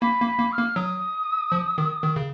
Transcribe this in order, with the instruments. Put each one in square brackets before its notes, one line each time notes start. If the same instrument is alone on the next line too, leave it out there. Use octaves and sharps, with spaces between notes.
[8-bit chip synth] A#3 [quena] B5
[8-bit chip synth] A#3
[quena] B5
[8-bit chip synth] A#3
[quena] F6
[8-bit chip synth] A#3
[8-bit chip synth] F#3 [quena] D#6
[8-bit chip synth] F3
D#3
D#3
C#3